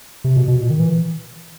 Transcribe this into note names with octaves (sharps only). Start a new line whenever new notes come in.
C3
B2
B2
A#2
D#3
E3